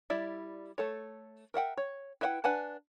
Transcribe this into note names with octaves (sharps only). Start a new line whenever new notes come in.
G3 E4 D5 E5
A3 A4 C#5
A#4 E5 F#5 G5
C#5
E4 B4 E5 F#5 G5
D4 B4 F#5 G#5 A5